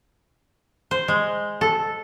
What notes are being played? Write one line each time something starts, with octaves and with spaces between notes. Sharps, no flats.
C5
G#3
A4